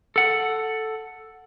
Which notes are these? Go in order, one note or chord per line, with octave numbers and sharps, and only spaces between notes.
A4 F#5